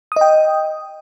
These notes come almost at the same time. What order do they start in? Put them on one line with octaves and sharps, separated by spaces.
D#6 D#5 G5